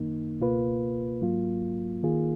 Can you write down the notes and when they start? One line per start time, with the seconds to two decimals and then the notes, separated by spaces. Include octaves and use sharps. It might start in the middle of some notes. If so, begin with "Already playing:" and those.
Already playing: F#2 D#3 A#3 D#4
0.40 C#2 B2 A#3 F4 B4
1.21 G#2 F#3 A#3 F4
2.03 D#3 A#3 F4 G#4